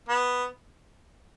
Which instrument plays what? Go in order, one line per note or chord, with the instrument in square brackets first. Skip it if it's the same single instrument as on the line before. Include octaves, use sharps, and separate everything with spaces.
[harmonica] B3